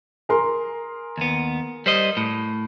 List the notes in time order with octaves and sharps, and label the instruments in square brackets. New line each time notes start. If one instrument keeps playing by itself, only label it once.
[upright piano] G#4 A#4 C6
[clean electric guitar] D#2 B3
G3 C5 D#5
A2